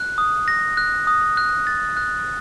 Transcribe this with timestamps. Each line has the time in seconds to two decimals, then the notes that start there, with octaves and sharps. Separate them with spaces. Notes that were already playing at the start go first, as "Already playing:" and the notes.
Already playing: F#6
0.18 D#6
0.48 A#6
0.77 F#6
1.07 D#6
1.37 F#6
1.67 A6
1.97 F#6